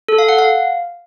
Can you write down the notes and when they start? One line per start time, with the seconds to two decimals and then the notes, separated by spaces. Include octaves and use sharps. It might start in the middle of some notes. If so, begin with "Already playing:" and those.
0.08 A4
0.18 F5
0.29 F#5
0.39 F5